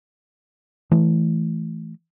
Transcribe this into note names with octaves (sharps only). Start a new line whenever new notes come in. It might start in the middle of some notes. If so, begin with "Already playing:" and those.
E3 A3